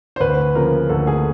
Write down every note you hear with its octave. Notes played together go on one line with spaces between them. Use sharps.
C5
D2 B4
C#3 F3 A#3 A#4
D2 A4
G#4